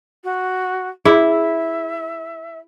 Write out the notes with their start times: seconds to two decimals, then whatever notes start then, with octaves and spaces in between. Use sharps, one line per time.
0.24 F#4
1.05 E4 G#4 E5